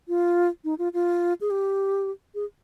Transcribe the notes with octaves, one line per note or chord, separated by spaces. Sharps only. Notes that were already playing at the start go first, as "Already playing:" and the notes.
F4
D#4
F4
F4
G#4
G4
G#4